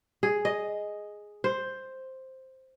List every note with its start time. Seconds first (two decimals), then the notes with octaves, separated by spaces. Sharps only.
0.23 G#4
0.45 D#5
1.44 C5